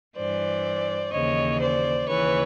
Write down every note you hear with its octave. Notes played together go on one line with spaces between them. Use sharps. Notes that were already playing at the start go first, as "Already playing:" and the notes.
G2 E3 C5 D5
D#2 C#3 E3 C#5 D#5
C5 D5
D#2 C#3 E3 B4 C#5